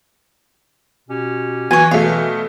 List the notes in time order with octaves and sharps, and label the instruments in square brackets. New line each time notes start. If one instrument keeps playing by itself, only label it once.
[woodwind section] B2 C#4 G4
[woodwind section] E3 [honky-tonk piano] F#3 B3 [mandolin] C#5 G#5
[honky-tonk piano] B2 F#3 A3 [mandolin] F5